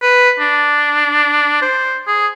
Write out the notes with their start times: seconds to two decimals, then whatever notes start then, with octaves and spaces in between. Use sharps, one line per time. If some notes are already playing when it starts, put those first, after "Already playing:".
0.02 B4
0.40 D4
1.62 C5
2.07 G#4